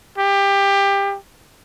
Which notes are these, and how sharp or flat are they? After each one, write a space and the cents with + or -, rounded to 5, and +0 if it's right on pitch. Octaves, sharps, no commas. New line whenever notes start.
G4 +20